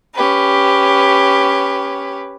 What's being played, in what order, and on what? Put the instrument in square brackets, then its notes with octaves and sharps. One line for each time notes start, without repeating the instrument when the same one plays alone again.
[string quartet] C#4 G4 B4